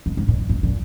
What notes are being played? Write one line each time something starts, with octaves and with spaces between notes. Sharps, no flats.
G#2
G#2
A#2
G#2
A#2